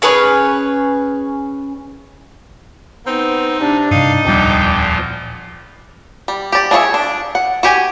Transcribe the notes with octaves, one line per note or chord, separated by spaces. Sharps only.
C#4 G#4 B4 C#5
B3 C4 D#4
C3 D4
G2 C3 D#4 F5
D1 E2 A#2 F3 G3 G5 D6
G3
G4 D5
D4 F4 G#4 C#5 E5
D4
F#5
F#4 G4 G#5